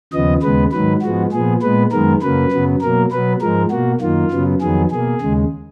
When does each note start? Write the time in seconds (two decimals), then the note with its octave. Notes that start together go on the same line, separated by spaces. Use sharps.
0.13 D#2 C#3 F3 B3 D#5
0.42 D#2 C#3 G#3 B3 B4
0.72 G#2 D#3 F#3 B4
1.02 G#2 F3 G#3 B3 F#4
1.32 A#2 F3 B3 G#4
1.62 A#2 G#3 B3 B4
1.92 F#2 D#3 G#3 B3 A#4
2.22 F#2 C#3 F#3 A#3 B4
2.52 F#2 C#3 F#3 B3
2.82 B2 F#3 A#3 A#4
3.11 B2 F#3 B3 B4
3.42 G#2 F3 G#3 A#4
3.71 B2 A#3 F#4
4.01 F#2 D#3 A#3 F4
4.31 F#2 C#3 F#3 B3
4.61 F2 D#3 F#3 B3 G#4
4.91 B2 A#3 G#4
5.21 D#2 C#3 G#3